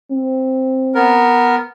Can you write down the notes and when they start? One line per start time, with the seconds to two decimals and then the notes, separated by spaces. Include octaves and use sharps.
0.12 C4
0.95 B3 A#4